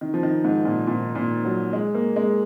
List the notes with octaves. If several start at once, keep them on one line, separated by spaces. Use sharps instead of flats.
D#3
F3
D#3
G#2
A#2
A#2
A#2
F#3
G#3
A#3
G#3